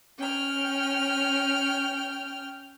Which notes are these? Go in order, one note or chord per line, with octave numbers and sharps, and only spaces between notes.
C#4 G5 F6